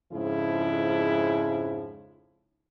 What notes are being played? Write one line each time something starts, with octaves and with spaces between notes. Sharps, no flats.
F2 G#2 C#3 F3 E4